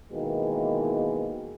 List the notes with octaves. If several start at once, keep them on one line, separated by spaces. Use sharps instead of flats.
B2 D#3 E3 G#3 A#3